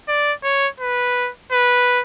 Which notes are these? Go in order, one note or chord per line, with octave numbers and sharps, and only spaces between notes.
D5
C#5
B4
B4